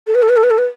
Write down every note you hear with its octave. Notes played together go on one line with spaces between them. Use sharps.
A4
B4
A4
B4
A4
B4
A4
B4